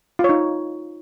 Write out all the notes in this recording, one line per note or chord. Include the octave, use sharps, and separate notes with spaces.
F4
C#5
D#4